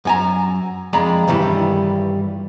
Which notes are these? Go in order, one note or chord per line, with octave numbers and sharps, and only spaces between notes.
F#2 G#5 A#5
F2 G#3 D5 A#5 B5
G2 D#3 E3 G3